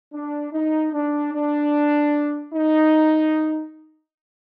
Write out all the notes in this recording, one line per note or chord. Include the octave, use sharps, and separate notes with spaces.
D4
D#4
D4
D4
D#4